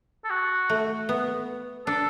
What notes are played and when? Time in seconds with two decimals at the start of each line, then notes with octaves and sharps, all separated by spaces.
0.25 A4
0.30 F#4
0.70 A3
1.09 B3
1.87 D4 A4